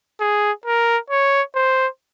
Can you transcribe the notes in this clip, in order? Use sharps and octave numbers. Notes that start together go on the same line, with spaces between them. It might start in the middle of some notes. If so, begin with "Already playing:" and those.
G#4
A#4
C#5
C5